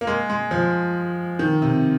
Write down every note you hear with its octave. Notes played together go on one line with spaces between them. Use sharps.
A#3
G#3
G#3
F3
D#3
C3